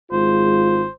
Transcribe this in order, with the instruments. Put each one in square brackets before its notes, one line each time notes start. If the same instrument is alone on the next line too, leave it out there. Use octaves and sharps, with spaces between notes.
[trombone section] G#1 G#3 F4 [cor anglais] C5